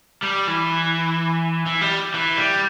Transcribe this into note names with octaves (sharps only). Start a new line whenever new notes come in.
G3
E3
E3
G3
E3
G3